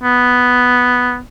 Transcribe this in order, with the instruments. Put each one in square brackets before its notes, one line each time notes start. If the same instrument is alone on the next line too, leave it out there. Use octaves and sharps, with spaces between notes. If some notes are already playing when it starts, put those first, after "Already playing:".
[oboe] B3